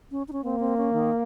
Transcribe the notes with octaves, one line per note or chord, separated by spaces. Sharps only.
C#4
D#4
C#4
A#3 C4
C4
C#4
D#3